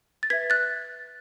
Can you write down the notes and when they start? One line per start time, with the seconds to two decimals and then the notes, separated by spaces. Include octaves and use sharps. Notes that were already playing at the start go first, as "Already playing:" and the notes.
0.23 A6
0.30 B4 E5 G#6 B6
0.50 F#6 A6